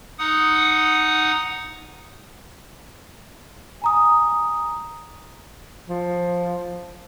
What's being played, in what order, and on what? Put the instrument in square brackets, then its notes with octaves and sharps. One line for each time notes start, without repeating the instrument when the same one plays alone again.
[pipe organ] D#4 F#5 D#6
[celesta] G#5 A#5 D#6
[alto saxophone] F3